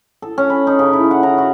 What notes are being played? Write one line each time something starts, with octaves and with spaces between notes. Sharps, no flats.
A4
C#4
B5
D#4
C#3
E4
F#5
A#5
F#4